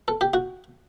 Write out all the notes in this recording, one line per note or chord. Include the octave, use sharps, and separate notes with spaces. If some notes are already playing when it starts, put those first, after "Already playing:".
A4
G4
F#4